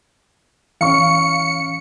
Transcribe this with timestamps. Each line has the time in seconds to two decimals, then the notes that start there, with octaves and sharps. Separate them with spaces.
0.81 E3 C#4 C#5 F5 C#6 C#7